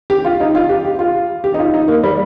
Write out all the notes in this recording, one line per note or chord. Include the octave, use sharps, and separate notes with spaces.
G4
F4
D#4
F4
G4
G4
F4
G4
D#4
F4
D#4
A#3
G3